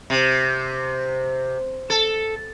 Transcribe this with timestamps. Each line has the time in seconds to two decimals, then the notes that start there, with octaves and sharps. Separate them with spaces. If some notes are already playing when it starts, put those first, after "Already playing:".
0.10 C3
1.90 A4